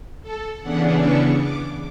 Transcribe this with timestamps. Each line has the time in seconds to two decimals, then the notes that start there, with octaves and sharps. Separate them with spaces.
0.22 A4
0.62 C#3 E3 B3 D4 F#5
1.01 C#6
1.40 D6